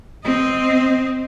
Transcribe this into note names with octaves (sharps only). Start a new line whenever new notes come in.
C4 D#5